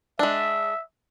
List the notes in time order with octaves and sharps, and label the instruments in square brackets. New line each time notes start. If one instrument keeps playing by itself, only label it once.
[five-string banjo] G#3 D4 [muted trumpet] E5